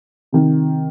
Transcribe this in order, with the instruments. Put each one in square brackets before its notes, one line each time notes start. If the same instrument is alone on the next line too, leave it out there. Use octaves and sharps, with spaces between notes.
[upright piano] C3 D#3